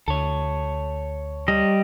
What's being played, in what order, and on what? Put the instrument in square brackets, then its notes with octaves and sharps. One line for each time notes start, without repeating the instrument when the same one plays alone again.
[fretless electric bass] D2 [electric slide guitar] A4 C#5
[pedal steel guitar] G3 D#5